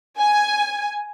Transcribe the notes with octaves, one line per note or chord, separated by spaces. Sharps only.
G#5